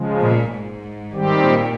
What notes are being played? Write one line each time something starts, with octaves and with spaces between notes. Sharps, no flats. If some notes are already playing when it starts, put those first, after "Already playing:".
Already playing: C#3 F3 G#3
A#2
G#2
D#3 G3 C4 G4
A#2